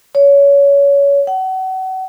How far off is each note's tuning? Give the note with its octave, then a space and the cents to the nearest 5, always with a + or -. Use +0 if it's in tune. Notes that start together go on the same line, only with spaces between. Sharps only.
C#5 +25
F#5 +35